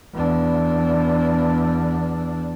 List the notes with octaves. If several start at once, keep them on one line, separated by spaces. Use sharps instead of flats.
E2 D4